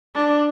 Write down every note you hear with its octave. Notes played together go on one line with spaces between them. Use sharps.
D4